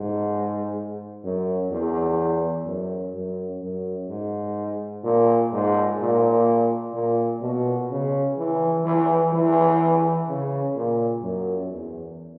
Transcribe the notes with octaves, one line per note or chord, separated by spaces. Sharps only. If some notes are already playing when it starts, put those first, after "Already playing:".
Already playing: G#2
F#2
E2
F#2
F#2
F#2
G#2
A#2
G#2
A#2
A#2
B2
C#3
E3
E3
E3
C#3
A#2
F#2
E2